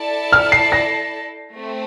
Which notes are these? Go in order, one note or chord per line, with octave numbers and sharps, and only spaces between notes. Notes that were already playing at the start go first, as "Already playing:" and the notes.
Already playing: E4 A4 D5 A5
F6
C7
A#6
A3 C4